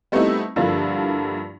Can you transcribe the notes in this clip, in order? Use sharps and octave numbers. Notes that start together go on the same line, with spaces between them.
G3 A3 B3 C4 D#4 E4
G2 D3 F3 A#3 D4 E4